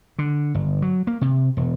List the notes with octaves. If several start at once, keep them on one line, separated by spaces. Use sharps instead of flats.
D3
G1
F#3
A#3
C3
E1